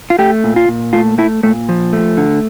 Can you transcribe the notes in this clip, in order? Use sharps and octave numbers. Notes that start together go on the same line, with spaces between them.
F4
A3 G4
A#2
F4
A#2
A3 F4
A3 E4
A#2 A3
F3
A3
D3